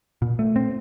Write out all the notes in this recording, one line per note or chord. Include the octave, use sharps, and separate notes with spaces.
A#2
A3
C4